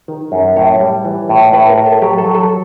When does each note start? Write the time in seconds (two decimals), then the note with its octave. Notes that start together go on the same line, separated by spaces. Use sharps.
0.08 D#3
0.32 F#2
0.56 A2 C#5
0.80 G3
1.05 E3
1.29 A2
1.53 A2 B4
1.69 A#4
1.78 A2
1.86 A4
2.02 F#3 G4
2.18 A4
2.26 F#3
2.35 A4